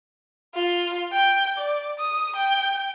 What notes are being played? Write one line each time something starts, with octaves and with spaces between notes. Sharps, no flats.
F4
G5
D5
D#6
G5